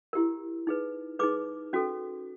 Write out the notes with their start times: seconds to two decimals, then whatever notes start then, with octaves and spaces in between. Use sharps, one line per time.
0.13 E4 G4 A#4
0.67 D#4 G#4 B4
1.19 D#4 G#4 B4 D6
1.73 C#4 F#4 A4